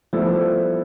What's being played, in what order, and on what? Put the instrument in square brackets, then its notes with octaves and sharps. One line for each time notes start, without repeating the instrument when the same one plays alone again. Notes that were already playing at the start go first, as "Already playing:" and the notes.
[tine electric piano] F3 [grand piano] G3 B3 E4 A4